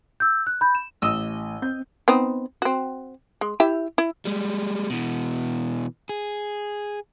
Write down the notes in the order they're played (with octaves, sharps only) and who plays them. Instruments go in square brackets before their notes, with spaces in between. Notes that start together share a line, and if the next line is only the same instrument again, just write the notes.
[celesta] E6 G6
F#6
B5 G6
E7
[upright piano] A1 [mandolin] D#5 E6
[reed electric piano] C4 [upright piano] G6
[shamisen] B3 C4 D#4
C4 F#4
G#3
E4 G4 E5
E4
[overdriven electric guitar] G3 G#3
B2 E3
G#4